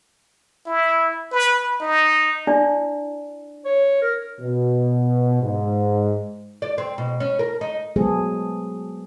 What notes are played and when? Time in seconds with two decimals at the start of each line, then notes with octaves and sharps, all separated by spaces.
0.67 E4
1.32 B4
1.81 D#4
2.47 D4 E4 D5
3.65 C#5
4.02 A#4
4.40 B2
5.43 G#2
6.62 D5
6.78 C4
6.98 B2
7.20 C#4
7.39 A#4
7.61 D#4
7.96 F#3 G#3 B3 G#4 A4 C5